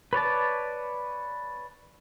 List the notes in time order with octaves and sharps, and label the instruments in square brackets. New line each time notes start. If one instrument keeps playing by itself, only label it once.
[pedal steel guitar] B4 C#5 D5 A5